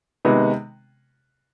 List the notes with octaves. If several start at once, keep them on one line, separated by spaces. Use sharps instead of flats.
C3 D#3 G#3 B3